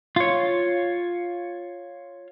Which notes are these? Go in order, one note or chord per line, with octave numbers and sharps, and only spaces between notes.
F4 C#5